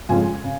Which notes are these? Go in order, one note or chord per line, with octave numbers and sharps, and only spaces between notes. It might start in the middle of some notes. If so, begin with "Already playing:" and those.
F2 C#3 F3 G#3 C#4 G#5
C#3